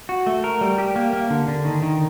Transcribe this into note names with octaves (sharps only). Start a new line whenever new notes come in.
F#4
A3
A#4
G3
G4
A#3
A#3
D3
D3
D#3
D#3